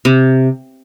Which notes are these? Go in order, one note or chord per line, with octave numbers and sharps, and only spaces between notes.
C3